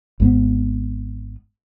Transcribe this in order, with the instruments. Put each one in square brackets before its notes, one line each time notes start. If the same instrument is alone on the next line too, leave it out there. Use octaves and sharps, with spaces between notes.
[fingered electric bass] G#1 G#2 B3